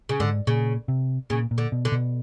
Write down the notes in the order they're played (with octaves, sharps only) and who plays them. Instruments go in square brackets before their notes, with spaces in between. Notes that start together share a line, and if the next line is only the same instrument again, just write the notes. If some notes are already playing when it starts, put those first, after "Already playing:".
[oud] C#3
[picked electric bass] G#2 [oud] D3
[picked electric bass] A#2 [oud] C#3
[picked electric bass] C3
[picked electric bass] A#2 [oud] C#3
[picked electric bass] A#2
[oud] D3
[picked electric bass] B2
[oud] D3
[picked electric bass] B2